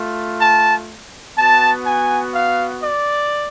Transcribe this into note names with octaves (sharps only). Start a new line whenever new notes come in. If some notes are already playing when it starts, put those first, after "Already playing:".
Already playing: A3 F4
A5
B3 F#4 A5
G#5
F5
D5